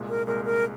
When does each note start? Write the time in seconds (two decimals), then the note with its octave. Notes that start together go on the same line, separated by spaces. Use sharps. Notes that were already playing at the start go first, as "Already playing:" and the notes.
Already playing: C2 A#2 G#3
0.09 A#4
0.27 C2 A#2 G#3 A#4
0.45 A#4